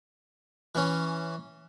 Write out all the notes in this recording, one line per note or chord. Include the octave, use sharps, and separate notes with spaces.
E3 C#4